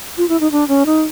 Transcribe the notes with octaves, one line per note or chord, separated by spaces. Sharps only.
F4
E4
D#4
D4
C#4
D#4